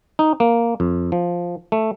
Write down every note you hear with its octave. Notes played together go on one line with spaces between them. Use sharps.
D#4
A#3
F2
F3
A3